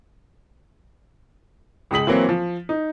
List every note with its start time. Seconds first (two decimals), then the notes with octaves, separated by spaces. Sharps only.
1.91 C#2 G#3 D#6 B6 F#7
2.07 E3 F#3 A#3 C4
2.29 F3
2.69 D#4